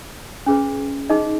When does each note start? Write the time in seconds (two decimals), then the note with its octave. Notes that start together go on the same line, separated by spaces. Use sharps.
0.46 C#4 G#4 B4
1.10 D#4 G#4 D#5